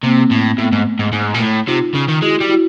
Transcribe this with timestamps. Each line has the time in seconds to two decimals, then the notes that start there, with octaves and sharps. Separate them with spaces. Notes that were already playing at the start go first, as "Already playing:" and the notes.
0.04 C3 A#3 C4
0.31 A2
0.58 A2 A3 B3
0.72 G#2
0.99 G#2
1.13 G#2
1.34 A#2
1.40 A2
1.68 C3 D#4 F4
1.95 C#3
2.09 D#3
2.22 G#3 E4 F#4
2.40 G3
2.50 E4 F#4